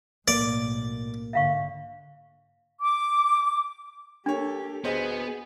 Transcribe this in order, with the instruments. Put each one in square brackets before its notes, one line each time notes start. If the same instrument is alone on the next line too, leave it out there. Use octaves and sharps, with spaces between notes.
[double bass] B1 A2 [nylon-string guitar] A#3 [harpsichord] D5
[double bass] G#2 D3 [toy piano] E5 F5 C#6
[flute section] D6
[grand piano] A#3 C#5 [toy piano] D4 [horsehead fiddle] G4 A4
[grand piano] D1 C5 D#5 [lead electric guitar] B3 [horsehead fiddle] G#4